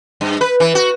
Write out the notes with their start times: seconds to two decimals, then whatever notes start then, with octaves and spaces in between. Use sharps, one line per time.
0.21 G2
0.41 B4
0.60 E3
0.75 F#4